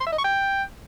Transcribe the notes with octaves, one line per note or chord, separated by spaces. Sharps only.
C6
E5
D#5
C#6
G5